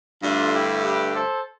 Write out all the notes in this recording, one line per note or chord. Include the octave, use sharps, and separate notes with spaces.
G2 D3 A3 D4 F4
E4 G4
G4 B4
A4 C5